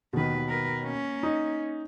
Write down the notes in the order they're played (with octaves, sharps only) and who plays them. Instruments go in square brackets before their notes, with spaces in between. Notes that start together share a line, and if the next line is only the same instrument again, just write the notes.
[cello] D#2 B4 [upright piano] B2 D#3
[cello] A#4 B4
A#3 C#4
[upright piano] D#4